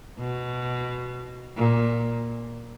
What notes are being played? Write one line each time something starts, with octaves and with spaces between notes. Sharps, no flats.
B2
A#2